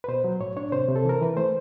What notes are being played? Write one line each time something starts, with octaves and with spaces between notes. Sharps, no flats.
B4
B2 C5
F#3
A2 C#5
D4 C#5
C3 C5
C3
A4
E3 A#4
E3 B4
A3 C5